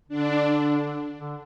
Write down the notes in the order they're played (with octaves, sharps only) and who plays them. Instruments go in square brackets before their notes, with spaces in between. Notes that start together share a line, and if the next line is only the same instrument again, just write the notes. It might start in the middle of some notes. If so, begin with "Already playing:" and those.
[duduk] D3 [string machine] D4
[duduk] D3